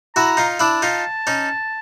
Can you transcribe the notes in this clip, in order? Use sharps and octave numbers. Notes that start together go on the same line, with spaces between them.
E4 F#4 A#5
D#4 F4
D4 E4 A5
D#4 F4
C#4 D#4